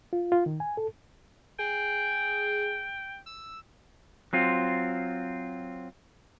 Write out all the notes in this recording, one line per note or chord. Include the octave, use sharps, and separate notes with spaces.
F4
F4
D#3
G#5
A4
G#4 G5
E6
F#3 C4 F4